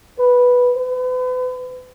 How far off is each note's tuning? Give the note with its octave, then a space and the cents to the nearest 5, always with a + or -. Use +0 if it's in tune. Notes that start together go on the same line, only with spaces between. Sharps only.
B4 -5
B4 +40